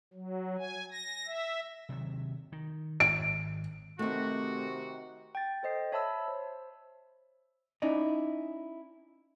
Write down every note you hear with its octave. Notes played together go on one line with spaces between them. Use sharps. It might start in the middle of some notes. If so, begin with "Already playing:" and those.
F#3
G#5
A#6
E5
C3 D#3 F#3
D#3
G#1 D7
C3 D#3 A3 C4 F#4
G5 A6
A4 C5 D#5 C7
C#5 E5 A5 B5 E6
C5
C#4 D#4 E4 D5 D#5